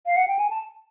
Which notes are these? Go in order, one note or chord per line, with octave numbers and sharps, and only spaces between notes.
F5
F#5
G5
G#5
A5